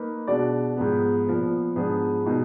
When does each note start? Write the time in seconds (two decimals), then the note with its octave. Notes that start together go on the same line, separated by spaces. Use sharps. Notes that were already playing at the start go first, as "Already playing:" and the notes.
Already playing: A#3 D#4 B4
0.28 B2 G#3 D4 F#4 D5
0.77 G#2 F3 G#3 B3
1.27 A#2 F3 B3
1.76 G#2 F3 B3 D4 G#4
2.26 B2 G#3 D#4 G#4